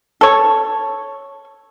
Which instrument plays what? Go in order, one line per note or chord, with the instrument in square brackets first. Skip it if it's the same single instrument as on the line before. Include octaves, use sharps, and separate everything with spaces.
[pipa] A4 C#5